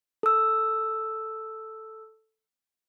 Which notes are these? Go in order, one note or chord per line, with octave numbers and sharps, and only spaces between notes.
A4 E6